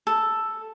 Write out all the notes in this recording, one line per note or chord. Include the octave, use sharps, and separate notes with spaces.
A4